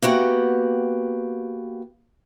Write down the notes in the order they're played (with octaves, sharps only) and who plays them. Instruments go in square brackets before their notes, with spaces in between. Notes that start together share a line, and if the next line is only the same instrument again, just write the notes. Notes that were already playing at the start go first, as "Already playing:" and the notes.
[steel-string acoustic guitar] A#3 B3 F#4 G4